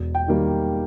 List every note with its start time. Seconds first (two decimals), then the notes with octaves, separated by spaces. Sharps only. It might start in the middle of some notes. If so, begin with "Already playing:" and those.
Already playing: E1
0.15 G5
0.28 D#3 G3 A#3